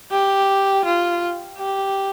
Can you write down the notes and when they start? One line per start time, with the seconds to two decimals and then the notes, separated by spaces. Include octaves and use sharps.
0.11 G4
0.85 F4
1.58 G4